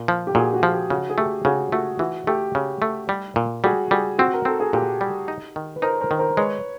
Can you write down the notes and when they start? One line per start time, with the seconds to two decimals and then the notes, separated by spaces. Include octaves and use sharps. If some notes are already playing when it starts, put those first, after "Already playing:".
Already playing: A#2
0.08 F3
0.27 G4
0.35 A#2 F#4 G#4
0.54 F#4
0.63 F3
0.72 G4
0.90 C#3 F#4
1.10 G#4
1.18 A3 G4
1.45 C#3 F#4 G#4
1.72 A3 F#4
1.99 E3 F#4
2.27 A3 G4
2.55 C#3
2.82 A3
3.09 G3
3.36 A#2
3.64 G3 F#4 G#4
3.91 G3 F#4 G#4
4.19 C4 F#4
4.34 A#4
4.45 C4 A4
4.60 G#4
4.73 A#2 G4
5.01 G3
5.28 D#4
5.56 D#3
5.76 B4
5.82 D#4 A#4 C5
6.01 A#4 C5
6.11 D#3
6.19 A#4 C5
6.37 G#3 B4 C#5